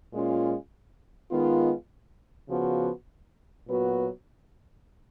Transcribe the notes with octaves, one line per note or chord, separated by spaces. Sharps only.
A#2 G#3 C#4 F4
D#3 G#3 B3 F4
C#3 F3 B3 F#4
A#2 F#3 B3 F#4 B4